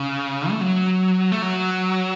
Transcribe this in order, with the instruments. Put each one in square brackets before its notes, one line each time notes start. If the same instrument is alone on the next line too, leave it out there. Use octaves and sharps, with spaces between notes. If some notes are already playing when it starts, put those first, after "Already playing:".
Already playing: [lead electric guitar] C#3
A3
F#3
A3
F#3